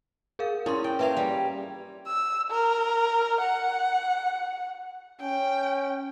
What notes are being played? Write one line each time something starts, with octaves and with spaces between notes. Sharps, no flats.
G#4 A#4 F5
C#4 E4 A#4 C6
G5
A#3 F4 G#4 B4 E5 F7
G3
E6
A#4
F#5
C#4 G5